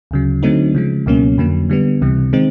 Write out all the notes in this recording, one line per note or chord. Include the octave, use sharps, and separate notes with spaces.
D2 C#3 F#3
D3 F#3 A3 C4 D#4
C#3 F3 G#3
C#2 B2 F#3 A#3 C#4
F2 D3 F#3 A#3
D3 G3 B3
C#2 C3 E3 G3
D#3 G#3 C4 D#4